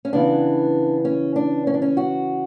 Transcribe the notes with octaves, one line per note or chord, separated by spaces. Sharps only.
C#4
C#3 E3 B3 D4
C#4
D4
C#4
D4
C#4
F#4